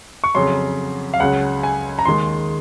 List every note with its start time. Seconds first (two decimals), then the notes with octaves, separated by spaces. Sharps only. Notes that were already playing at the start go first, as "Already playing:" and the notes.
0.24 C#6
0.35 F2 C#3 F#3 C6
1.14 F5
1.20 C#2 C#3 F#3 F#5
1.63 G#5
1.99 A#5
2.05 D#2 D#3 G#3 C6